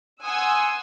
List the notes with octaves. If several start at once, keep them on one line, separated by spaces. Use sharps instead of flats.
F#5 G#5 C6 D#6 E6